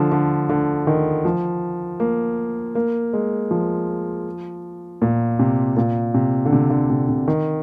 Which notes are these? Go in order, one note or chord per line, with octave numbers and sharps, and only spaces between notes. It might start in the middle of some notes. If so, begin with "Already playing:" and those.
Already playing: D3 F3
D3
D3
D#3
F3
A#3
A#3
G#3
F3
A#2
C3
A#2
C3
D3
C3
D3
C3
C3
D#3